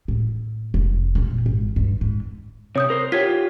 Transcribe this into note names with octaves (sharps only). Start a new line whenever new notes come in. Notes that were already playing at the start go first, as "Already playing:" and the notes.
A2
F1
A#2
G#1
G2
G#2
C3 C#5 D#6 G6
A#4 C5
F4 G4 C#5 G#6 B6